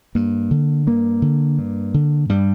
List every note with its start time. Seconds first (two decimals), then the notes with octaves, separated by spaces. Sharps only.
0.15 G2 A#3
0.51 D3
0.87 G2 A#3
1.22 D3
1.59 G2
1.94 D3
2.29 G2 G3